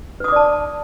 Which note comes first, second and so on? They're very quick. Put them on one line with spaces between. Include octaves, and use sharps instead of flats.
B4 D#6 D6 D5 A5